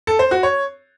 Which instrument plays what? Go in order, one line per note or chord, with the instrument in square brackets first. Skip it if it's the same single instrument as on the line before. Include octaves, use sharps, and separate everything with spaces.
[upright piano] A4
C5
F#4
C#5